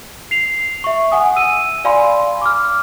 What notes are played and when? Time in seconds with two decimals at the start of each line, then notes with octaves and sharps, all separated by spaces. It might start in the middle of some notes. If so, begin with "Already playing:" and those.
0.31 C7 F7
0.84 E5 C#6
1.12 F#5 G#5 D#6
1.36 E6 D#7
1.85 D5 F5 G#5 B5 C6
2.42 D6 F6